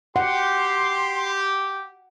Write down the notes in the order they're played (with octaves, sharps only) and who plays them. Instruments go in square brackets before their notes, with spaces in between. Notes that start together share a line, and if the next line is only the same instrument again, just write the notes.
[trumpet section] G4 [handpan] F#5 [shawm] C6